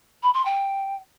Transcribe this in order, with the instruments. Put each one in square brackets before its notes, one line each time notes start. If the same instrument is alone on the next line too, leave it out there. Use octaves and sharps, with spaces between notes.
[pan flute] B5
C6
G5